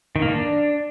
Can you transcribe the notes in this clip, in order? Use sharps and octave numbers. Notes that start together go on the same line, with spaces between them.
D#3
A#3
D4